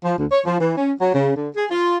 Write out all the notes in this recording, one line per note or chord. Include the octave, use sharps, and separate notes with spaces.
F3
D2
C#5
F3
E3
C#4
F#3
C#3
D3
G#4
F4